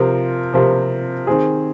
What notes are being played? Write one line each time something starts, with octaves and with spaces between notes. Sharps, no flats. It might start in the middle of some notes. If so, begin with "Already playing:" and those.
Already playing: C3 F3 C4 F4 A#4
C3 F3 C4 F4 A#4
D#3 C4 G#4